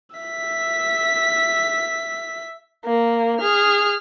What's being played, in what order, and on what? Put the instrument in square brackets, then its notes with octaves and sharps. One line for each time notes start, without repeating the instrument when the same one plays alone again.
[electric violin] E5 B6
[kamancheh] A#3
G#4 F6